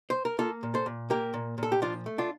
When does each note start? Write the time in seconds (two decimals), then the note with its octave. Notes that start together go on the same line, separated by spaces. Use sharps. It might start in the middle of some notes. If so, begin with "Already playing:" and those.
0.10 C5
0.25 A#4
0.39 A#3 F4 A4
0.63 A#2
0.74 A4 C5
0.86 A#2
1.10 A#3 G4 A#4
1.34 A#2
1.58 A#2 A4
1.72 G4
1.82 F3 D4 F4
2.06 A3
2.18 D4 F4